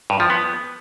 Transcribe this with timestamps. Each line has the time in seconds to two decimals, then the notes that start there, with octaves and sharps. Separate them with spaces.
0.10 G2
0.20 F3
0.30 B3